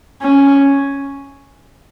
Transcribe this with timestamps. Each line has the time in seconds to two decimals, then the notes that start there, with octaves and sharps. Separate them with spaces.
0.22 C#4